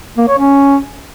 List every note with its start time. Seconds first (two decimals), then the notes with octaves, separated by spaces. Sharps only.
0.18 A#3
0.28 C#5
0.39 C#4